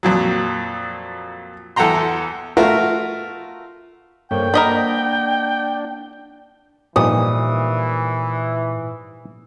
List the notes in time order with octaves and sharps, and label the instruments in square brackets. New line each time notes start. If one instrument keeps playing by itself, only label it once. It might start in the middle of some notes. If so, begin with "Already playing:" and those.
[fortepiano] F2 A#2 F#3
E2 A4 F#5 G5 A#5 C6
A3 F4 F#4 A#4 E5
[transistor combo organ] G2 A#3 C#5 [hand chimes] A4 A#4 C5 [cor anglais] G5
[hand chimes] A#3 F#5 A#6 [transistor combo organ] D4 [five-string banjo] A#4 D#5 B5
[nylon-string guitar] A#2 B4 [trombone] E3 [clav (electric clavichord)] F3 G3 D#4 [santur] D#6